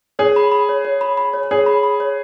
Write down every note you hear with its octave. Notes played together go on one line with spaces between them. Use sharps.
G#4 C#5
B5
B5
C#5
C#5
B5
B5
C#5
G#4 C#5
B5
B5
C#5